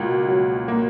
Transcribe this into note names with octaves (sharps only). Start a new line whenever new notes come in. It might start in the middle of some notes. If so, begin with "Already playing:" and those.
Already playing: C#2 B2 A#3
F#3
A#3